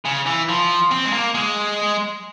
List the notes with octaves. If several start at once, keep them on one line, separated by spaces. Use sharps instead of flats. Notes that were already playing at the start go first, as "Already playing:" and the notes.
C#3
E3
F3
C4
G#3
A#3
G#3